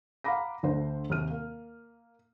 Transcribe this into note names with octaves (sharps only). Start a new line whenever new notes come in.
F5 F#5 A#5 B5 D6 A#6
D2 D3 D4 C5
D#2 C3 G4 F6 D#7
A#3